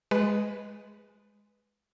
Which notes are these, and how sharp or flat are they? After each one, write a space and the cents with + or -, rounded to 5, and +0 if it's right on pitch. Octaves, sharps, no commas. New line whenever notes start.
G#3 +0 B4 +0